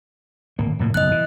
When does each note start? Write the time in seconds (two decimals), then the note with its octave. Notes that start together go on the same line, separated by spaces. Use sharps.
0.59 D1 G#1 A#3
0.79 F1 A2 A#3
0.94 F#1 B1 D#5 F#6
1.12 E3